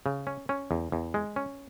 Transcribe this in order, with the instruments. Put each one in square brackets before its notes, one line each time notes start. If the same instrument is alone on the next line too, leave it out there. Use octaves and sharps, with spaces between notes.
[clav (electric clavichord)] C#3
C#4
C#4
E2
E2
G#3
C#4